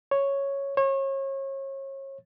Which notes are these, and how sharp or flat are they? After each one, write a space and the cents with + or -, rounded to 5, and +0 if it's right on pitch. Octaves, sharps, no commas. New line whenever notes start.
C#5 +0
C#5 -30